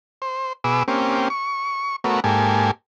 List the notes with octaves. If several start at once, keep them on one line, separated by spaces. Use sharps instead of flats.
C5
B2 G#4 B4 D6 E6
A#3 C4 C#4 G4
C#6
A3 B3 F#4 A#4 C#5
G#2 A#3 G4 A4 G#5